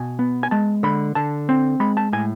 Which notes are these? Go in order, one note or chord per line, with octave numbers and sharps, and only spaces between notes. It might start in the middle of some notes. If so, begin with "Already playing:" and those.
Already playing: B2 G#5
B3
G#5
G#3 A5
D3 B5
D3 A5
C4
G#3 B5
A5
A2 G#5